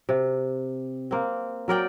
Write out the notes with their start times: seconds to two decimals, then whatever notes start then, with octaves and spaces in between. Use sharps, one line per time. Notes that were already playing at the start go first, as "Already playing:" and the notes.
0.09 C3
1.11 A#3 C4
1.68 F#3 A#4 D5 G5